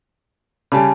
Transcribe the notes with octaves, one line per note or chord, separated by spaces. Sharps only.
C#3 G3 G#5 A5 B5